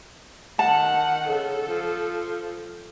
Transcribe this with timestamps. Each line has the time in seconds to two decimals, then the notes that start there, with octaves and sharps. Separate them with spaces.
0.59 D#3 F#5 A5
1.28 C#3 A4
1.66 F3